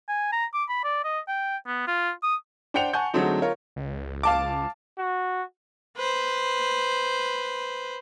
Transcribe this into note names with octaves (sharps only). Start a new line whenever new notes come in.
G#5
A#5
D6
B5
D5
D#5
G5
B3
F4
D#6
D4 C5 F#5 G5 C#7 F7
F#5 G#5 A5 C#6 G6
D3 F#3 G#3 A3 C4 D#4
F4 A#4 C#5
C#2
F5 A5 D6
F#4
B4 C5